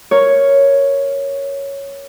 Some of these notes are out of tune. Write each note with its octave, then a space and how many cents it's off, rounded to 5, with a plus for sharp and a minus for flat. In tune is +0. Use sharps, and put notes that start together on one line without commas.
A#4 +0 C#5 +0